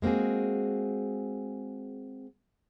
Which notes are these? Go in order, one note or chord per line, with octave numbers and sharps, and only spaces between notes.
G#3 A#3 C4 F#4 G#4